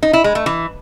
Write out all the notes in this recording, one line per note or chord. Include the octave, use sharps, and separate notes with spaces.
D#4
E4
G#3
A3
E3